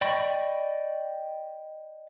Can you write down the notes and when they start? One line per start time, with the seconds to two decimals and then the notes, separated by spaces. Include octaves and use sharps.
0.01 D5 D#5 G5 B5 C#6